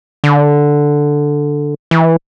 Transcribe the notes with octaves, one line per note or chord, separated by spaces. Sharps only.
D3
E3